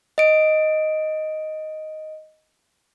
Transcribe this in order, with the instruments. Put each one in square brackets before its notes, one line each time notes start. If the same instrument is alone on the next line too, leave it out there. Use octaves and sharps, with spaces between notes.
[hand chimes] D#5 D7